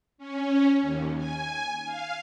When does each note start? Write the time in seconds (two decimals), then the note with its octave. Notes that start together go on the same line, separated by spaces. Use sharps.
0.18 C#4
0.82 D#2
1.17 G#5
1.85 F5